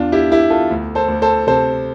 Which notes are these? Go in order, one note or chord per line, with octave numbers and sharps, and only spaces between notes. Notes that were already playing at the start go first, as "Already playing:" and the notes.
Already playing: E2 D4 F4
E4 G4
E2 E4 G4
F4 A4
D2
A4 C5
D2
A4 C5
C3 A4 C5